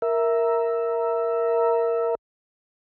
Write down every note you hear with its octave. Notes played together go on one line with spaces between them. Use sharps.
A#4 E5